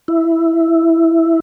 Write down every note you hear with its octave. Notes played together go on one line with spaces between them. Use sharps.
E4